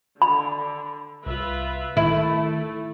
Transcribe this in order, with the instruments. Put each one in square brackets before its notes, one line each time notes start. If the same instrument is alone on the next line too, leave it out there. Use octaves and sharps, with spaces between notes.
[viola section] D3 [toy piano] B5
[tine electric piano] C2 [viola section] F4 B4 E5
[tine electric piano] D#3 [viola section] A3 [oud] E4